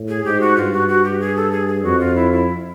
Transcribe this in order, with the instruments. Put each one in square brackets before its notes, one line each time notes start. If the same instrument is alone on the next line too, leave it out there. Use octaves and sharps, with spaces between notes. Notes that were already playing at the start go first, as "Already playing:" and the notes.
Already playing: [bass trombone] A2
[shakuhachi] G#4
[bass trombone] G#2 [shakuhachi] G4
[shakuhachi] F#4
[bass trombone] G2 [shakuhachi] F4
[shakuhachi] F#4
F#4
G4
G#4
A4
G#4
G#4
[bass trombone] F2 [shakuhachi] F#4
[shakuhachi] F4
E4
E4